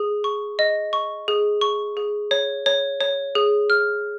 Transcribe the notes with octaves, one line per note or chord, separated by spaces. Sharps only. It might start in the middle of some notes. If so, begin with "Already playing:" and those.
Already playing: G#4
C#6
D#5
C#6
G#4
C#6
G#4
C#5
C#5
C#5
G#4
F6